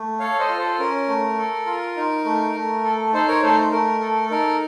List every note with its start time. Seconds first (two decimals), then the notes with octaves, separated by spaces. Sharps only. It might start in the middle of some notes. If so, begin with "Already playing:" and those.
Already playing: A3
0.19 A4 C#5 F5
0.40 C5 D#5
0.49 F4
0.59 A4 C5
0.79 C#4 A#4
1.07 A3
1.38 A4
1.66 F4
1.96 D#4
2.25 A3
2.54 A3
2.84 A4
3.13 D#4 A4 C5
3.28 A#4 C#5
3.43 A3 A4 C5
3.72 A3 A#4
4.01 A4
4.31 D#4 A#4